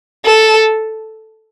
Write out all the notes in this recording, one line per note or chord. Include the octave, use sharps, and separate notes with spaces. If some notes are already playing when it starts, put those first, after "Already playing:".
A4